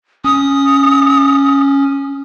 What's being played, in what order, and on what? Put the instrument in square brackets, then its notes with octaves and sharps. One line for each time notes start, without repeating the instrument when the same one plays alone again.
[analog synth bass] C#4 [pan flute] D#6